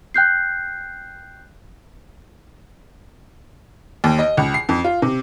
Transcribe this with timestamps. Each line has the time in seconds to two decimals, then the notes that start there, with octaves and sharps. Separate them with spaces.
0.14 G5 F#6 G6 C7
4.04 D#2
4.19 D#5
4.37 C#2
4.54 C7
4.69 F2
4.84 F4
5.02 C3